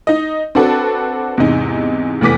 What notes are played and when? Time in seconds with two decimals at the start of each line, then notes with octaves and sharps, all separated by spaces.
0.07 D#4 D#5
0.55 C4 D4 F#4 A4 B4
1.38 E2 G#2 C3 D#4
2.21 F1 E2 B3 D6 B6